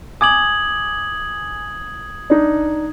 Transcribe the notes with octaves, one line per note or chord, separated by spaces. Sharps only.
G#5 D6 D#6 G#6 F#7
D4 D#4